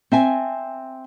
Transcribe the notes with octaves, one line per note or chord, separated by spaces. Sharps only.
C4 E5 G#5